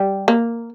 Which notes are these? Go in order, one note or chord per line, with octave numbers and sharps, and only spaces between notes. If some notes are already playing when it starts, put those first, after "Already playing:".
Already playing: G3
A#3